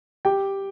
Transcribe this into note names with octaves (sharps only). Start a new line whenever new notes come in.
G4 G5